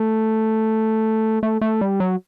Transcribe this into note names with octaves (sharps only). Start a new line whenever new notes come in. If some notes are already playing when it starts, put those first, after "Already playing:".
Already playing: A3
A3
A3
G3
F#3